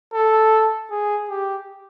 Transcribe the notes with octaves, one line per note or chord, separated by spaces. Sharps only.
A4
G#4
G4